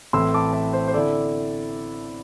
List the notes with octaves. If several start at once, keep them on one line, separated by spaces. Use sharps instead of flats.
A1 A2 A3 C4 E4 C6 E6
A5 D6
E5 A5
C5
C5
D3 C4 E4 A4 D5